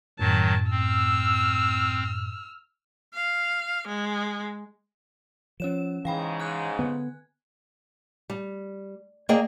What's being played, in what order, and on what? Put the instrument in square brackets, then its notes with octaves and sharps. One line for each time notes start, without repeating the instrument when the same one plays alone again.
[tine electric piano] F#2 A2 [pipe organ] D#3 F#3 [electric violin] A5
[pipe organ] C4 [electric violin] E6 F6
[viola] F5
G#3
[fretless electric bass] F3 [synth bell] C#4 C#5 E7
[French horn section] G#2 C#3 [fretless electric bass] E3 [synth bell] F5 G5 B5
[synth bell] G#5 F#6 G#6
[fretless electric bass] D3 B3
[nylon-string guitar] G3
A#3 G#4 D5 D#5 G5